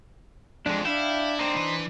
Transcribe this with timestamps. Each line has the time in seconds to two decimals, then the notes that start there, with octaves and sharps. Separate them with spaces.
0.66 F2 G#3 D4
0.85 D4 E4 E5 F5 G5
1.39 A#3 C4 D#4 C5
1.56 E3 B4